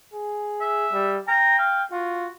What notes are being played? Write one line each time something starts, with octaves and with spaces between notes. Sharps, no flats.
G#4
E5
G3
G5 A#5
F5
F4 F#4